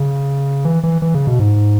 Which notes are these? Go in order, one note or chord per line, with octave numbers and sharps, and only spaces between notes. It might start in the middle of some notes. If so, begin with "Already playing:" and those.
Already playing: C#3
E3
E3
E3
C#3
B2
G#2